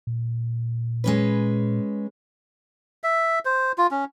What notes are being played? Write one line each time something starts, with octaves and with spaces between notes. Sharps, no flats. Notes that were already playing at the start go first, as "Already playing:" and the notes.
A#2
G#3 C#4 B4
E5
C5
F4
C#4